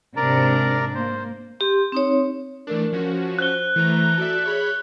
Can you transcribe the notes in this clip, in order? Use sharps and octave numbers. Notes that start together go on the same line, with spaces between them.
G#2 C3 D4 A#4 D5 A#5
A#3 C5
G4 C6
C4 D#4 C#5
E3 A3 D4 A#4
F3 C#4 F#4
C5 F#6 G7
E3 A3 A#5
F#4 A4 D5 E5
G#4 C#5 B5